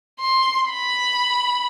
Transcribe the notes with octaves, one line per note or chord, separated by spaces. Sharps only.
C6
B5